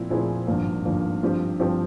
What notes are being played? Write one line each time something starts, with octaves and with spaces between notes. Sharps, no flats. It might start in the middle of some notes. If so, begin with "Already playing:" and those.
Already playing: A#2 F3 C4 E4
A#2 F3 C4 E4 G#4
G#1 G2 F3 A#3
G#1 G2 F3 A#3
G2 F3 C4 G4
G2 F3 C4 G4